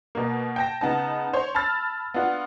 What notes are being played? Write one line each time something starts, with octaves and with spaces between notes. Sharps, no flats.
B2 A#3
G5 A5 A#6
C#3 B3 D#4 A5
C5 C#5
A5 B5 E6 F6 A6
B3 D4 F4 F#4